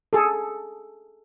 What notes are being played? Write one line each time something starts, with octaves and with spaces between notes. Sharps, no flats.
G#4 A4